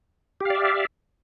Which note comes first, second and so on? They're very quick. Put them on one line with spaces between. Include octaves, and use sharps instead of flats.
G4 F5 D5 E5